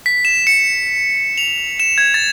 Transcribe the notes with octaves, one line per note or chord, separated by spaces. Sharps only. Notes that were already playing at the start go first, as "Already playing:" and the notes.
B6
E7
C#7
F7
E7
G#6
A6